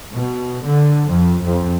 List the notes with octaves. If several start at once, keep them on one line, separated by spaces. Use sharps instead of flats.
B2
D3
F2
F2